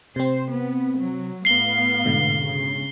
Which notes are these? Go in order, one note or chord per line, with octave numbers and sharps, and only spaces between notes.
C3 C4 C5
B3
F#3
A2 B3 F5 C7 G7
G#2 B2 D3
C#3